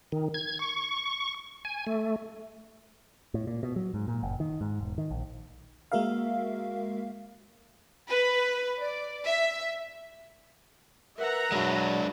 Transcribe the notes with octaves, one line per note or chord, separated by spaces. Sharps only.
D#3
G#6
C#6
G#5
A3
A2
A#2
B2
F#3
G#2
A#2
F#1
D#3
G#2
E1
D#3
A#1
G#3 A#3 F#4 A#4 E5 F5
B4
D5
E5
A#4 B4 E5 F#5 A#5
F#3 G#3 D4 D5 B5